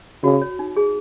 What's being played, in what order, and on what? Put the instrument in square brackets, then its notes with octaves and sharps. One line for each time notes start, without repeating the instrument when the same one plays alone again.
[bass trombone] C#3 [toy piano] F#4
[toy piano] C#5
D#4
G#4